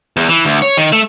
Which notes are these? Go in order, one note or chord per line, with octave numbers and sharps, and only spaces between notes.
E2
E3
D2
C#5
D#3
A3